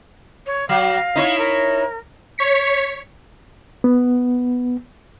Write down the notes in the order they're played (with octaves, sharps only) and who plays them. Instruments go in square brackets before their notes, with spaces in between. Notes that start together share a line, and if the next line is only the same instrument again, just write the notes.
[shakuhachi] C#5
[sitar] F#3 [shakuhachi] F5
[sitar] D#4 E4 C#5
[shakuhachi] A#4
[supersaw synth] C#5 B6 C#7
[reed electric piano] B3